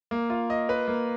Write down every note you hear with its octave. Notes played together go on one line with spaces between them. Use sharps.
A#3
F4
D#5
B4
A#3